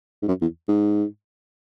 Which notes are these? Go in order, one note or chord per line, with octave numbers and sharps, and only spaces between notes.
G#2
F#2
E2
G#2